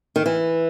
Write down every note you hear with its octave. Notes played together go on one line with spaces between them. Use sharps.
D#3
E3